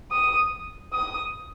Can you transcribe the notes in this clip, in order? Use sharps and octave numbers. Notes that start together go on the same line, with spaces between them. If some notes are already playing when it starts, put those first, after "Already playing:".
D#6
D#6